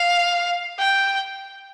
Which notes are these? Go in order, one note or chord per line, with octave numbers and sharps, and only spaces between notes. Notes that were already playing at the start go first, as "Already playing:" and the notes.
Already playing: F5
G5